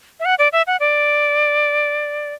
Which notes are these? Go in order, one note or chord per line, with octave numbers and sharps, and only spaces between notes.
E5
F#5
D5
E5
F#5
D5